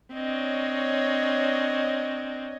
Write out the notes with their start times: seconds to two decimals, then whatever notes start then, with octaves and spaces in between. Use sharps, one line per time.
0.14 C4 D4 C#5 D#5